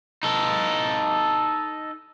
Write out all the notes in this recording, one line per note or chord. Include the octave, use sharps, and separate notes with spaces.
D#4 A4